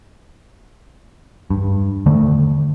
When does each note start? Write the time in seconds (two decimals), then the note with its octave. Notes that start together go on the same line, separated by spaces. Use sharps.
1.50 G2
2.06 D3 D#3 A3